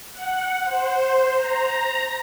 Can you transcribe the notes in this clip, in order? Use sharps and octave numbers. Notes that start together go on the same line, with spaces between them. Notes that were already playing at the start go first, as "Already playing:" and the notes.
F#5
C5
A#5